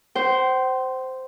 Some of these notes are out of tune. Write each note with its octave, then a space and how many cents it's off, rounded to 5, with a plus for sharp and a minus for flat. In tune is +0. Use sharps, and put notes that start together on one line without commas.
C5 -5 G5 -45